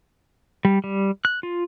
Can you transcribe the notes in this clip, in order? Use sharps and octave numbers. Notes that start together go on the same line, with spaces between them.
G3
G3
F#6
F4